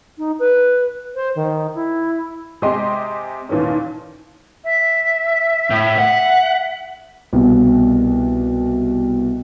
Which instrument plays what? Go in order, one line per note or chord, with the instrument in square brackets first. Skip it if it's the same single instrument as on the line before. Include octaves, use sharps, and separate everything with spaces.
[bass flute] D#4
B4
C5
D#3
E4
[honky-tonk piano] C3 G#3 G4 D#5 C6
D#2 A#2 D#3 E3 C#4
[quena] E5
[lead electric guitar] A2
F#5
[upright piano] C2 B2